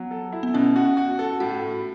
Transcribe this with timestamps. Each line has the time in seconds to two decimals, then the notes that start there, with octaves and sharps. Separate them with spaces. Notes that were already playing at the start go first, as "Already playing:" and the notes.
Already playing: F#3 B3
0.11 A4
0.33 E4
0.43 B3
0.54 B2 C#4
0.76 F#4
0.97 F#4
1.19 A4
1.40 A2 F#4
1.62 A2